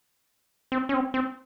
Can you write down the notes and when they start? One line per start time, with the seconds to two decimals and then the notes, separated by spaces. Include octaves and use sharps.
0.72 C4
0.89 C#4
0.94 C4
1.14 C4